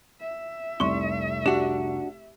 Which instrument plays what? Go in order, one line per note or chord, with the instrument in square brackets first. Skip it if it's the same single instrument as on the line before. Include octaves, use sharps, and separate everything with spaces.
[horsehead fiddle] E5
[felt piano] F1 C2 C#6 [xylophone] C6 G7
[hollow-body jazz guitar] D4 F#4 [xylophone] G4